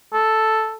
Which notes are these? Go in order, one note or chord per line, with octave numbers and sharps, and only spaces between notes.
A4